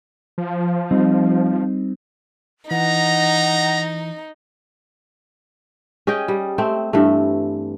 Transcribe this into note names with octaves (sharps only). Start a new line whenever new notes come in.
F3
G3 C4 D#4
E3 D#4 F#5 A#5
C#4 G#4 D#5 G5
G3
A3 C4
G2 E3 A3